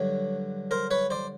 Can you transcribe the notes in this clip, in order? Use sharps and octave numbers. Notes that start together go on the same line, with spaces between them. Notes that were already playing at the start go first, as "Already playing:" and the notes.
Already playing: G2 D3 F#3 C#5
A#4 C5
B4 C#5
C5 D5